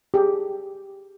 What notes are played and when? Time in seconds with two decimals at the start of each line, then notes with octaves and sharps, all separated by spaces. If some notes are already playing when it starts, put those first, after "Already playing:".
0.14 G4 G#4